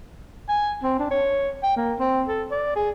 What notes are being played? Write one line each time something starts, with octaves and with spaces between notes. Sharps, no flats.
G#5
C4
D4
C#5
G5
A#3
C4
A4
D5
G#4